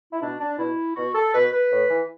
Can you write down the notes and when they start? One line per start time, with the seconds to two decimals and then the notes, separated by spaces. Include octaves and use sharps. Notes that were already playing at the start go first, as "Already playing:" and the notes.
0.13 E4
0.21 B2 D4
0.40 D4
0.59 B2 E4
0.96 B2 F#4
1.15 A4
1.34 B2 B4
1.53 B4
1.72 A2
1.90 E3